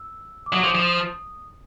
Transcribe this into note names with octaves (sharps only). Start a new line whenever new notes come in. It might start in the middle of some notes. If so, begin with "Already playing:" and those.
Already playing: E6
D6
F#3 D#6
F3 D6
D#6
F3
D#6